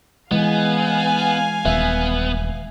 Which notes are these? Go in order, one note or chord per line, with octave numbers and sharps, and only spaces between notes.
E3 G#3 B3 F5 G#5
D#1 B3 E5